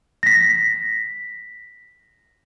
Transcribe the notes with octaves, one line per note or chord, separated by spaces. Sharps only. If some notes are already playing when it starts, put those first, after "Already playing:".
A#6 B6